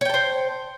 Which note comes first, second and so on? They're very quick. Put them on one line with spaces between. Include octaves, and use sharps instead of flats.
C#5 G5 A5 C5